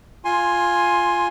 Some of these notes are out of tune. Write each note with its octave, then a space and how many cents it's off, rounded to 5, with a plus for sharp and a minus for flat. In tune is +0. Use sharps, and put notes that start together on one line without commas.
F4 +0 G#5 +0 C6 +15